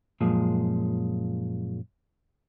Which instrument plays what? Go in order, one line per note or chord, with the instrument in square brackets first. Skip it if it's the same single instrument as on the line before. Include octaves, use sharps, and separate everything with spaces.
[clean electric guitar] F#2 A#2 F3 G#3